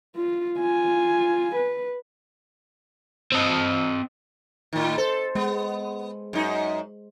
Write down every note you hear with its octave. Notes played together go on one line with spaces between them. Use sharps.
F4
F4 G#5
B4
C4 D#5
A2 D#3
A4 C5
G#3 B3
F#2 D#4